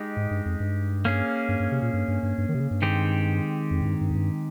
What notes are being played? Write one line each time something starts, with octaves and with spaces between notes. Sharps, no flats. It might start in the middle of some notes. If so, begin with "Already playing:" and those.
Already playing: G#3 D#4 G4
G#2
G2
F2
G2
A#3 C#4 G#4
G2
G2
C3
A#2
G2
G2
G2
G2
D#3
C3
C#3
G2
D#3 G#3 C4 G4
F2
G#2
G2
G2
F2
G2